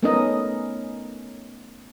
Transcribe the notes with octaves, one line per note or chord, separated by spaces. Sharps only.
A3 B3 C#4 D#4 A#4 D#5